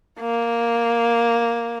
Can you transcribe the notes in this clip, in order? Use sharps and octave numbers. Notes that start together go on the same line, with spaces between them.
A#3